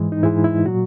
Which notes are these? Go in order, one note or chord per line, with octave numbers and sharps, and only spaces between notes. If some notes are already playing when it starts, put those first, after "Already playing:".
Already playing: G#2 E3 G#3
D#4
G#2 E3 G#3 E4
E4
A#2 F#3 F#4